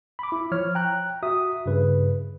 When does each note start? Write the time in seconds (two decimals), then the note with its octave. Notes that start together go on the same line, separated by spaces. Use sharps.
0.19 B5 D6
0.32 E4
0.52 F3 C#5 F6
0.75 G5 A#5 F#6
1.23 F#4 E5 D#6
1.66 G2 C#3 B4